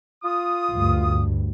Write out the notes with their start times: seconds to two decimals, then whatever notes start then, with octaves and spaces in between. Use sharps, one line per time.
0.23 F4 D#6
0.72 D2 G2